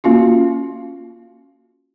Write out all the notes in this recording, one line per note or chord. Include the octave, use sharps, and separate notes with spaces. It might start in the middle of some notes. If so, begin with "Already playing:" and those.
A#3 C#4 F4 F#4